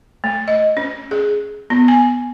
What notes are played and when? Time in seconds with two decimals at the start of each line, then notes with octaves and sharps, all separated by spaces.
0.24 A3
0.48 D#5
0.77 C#4
1.11 G#4
1.70 B3
1.88 G#5